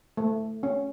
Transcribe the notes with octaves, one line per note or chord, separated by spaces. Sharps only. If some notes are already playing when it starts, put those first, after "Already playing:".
A3
C#4